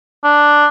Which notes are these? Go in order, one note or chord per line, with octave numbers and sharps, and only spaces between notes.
D4